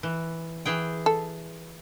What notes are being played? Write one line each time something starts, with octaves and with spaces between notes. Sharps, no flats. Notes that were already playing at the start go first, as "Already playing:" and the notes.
E3
E3 G#4 G5
A4